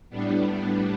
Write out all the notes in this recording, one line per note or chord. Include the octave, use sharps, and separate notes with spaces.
A2 G3 B3 D4